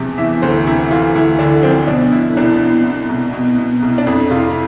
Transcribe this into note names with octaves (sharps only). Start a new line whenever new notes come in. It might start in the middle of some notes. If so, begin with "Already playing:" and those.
Already playing: E2 C3 F3
E3 E5
D2 C5
C3 E4
E3 F4
D2 E4
D3 D4
F3 C4
B2 D4
B2 E4
C2 D4
B2
B2
C2
B2
B2
C2
D4
F2 E4
C3 F4